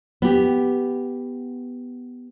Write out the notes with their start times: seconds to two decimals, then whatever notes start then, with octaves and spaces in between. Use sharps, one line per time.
0.22 B3 G4